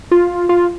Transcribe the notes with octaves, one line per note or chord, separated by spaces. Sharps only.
F4
F4